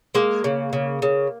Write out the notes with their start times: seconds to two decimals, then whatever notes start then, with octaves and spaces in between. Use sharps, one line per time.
0.15 G#3 A#3
0.44 C#3
0.73 C#3
1.02 C#3